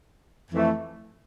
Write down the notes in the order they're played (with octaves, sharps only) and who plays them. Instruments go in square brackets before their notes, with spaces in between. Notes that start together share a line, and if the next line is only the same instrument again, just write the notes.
[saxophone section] F2 E3 A3 E4